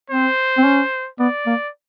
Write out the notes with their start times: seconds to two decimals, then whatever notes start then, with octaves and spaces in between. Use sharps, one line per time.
0.10 C4 C5
0.58 C4
0.65 C#4
1.19 B3 D5
1.46 A#3